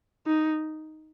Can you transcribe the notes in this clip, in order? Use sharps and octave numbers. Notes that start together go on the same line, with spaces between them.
D#4